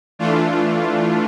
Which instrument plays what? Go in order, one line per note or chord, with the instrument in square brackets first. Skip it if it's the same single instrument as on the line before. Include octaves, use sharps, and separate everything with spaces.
[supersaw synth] E3 A3 D4 F4